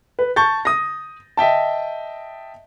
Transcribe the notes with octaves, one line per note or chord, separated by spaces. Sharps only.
B4
A5 C#6 G6 A6
D#6 A#6
D#5 E5 G5 A5